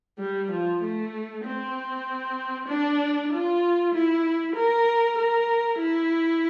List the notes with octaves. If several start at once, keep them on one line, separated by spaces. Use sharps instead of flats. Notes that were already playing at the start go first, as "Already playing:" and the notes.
G3
F3
A3
C4
D4
F4
E4
A#4
A#4
E4